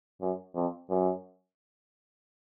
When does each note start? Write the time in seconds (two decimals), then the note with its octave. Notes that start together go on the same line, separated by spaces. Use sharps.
0.21 F#2
0.55 F2
0.90 F#2